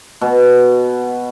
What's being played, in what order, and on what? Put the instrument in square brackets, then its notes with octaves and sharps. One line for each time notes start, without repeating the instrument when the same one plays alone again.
[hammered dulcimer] B2